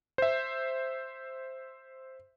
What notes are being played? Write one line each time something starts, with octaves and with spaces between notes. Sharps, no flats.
C5 E5